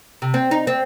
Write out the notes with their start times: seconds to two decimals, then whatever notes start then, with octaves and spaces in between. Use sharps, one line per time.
0.22 C3
0.34 C4
0.51 D#4
0.67 C4